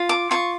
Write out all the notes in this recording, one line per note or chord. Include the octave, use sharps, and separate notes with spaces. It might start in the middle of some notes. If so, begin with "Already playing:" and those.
Already playing: F4
D6
F4 C#6